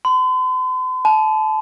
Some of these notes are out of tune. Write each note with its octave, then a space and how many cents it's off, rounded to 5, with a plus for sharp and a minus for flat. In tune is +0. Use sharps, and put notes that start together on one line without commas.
C6 -45
A5 -25